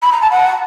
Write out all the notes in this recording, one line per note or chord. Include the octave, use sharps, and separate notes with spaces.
B5
A#5
A5
F#5